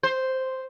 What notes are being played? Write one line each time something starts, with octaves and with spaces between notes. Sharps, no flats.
C5